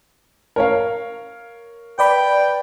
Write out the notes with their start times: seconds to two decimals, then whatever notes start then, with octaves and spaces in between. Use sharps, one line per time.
0.56 A#4 C#5 F5
1.99 B4 D5 G5 B5